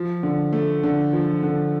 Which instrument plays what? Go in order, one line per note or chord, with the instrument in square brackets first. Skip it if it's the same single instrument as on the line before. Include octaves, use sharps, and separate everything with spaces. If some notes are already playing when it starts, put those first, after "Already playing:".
Already playing: [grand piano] F3
D3
A3
D3
F3
D3